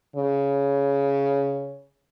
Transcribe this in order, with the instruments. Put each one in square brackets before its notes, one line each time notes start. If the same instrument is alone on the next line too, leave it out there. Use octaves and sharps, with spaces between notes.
[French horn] C#3